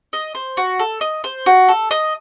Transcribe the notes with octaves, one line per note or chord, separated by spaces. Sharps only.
D#5
C5
F#4
A4
D#5
C5
F#4
A4
D#5